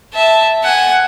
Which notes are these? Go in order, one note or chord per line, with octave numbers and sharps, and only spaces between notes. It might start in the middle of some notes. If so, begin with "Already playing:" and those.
E5 A5
F#5 G#5